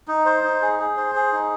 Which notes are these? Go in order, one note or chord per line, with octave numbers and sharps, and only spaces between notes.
D#4
C5
D#4
G#4
G#4
C5
G#4
D#4